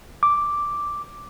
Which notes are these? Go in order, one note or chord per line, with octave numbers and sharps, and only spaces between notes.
D6